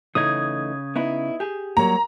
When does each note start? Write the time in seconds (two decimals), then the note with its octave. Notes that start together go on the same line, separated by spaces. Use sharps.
0.15 C#3 E3 A3 D#4 D#6 G#6
0.96 B3 D#4 E4
1.40 G4 G#4
1.77 F#3 G3 A#3 A#5